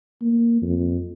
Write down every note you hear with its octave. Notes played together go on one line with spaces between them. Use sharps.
A#3
F2